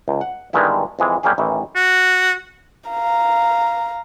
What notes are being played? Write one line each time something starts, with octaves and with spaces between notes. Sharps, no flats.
C#2
F#5
G2 D3 D#3 G#3 B3 E4
F2 E3 G#3
G3 G#3 A#3 C#4 G4 G#4
A1 D#3 E3
F#4
F5 A#5